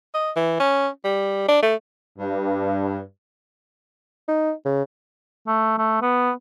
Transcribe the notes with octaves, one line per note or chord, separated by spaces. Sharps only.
D#5
E3
C#4
G3
D4
A3
G2
D#4
C#3
A3
A3
B3